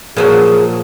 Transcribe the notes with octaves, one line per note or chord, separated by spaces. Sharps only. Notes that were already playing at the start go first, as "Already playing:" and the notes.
A#2 F3 F#3 G#4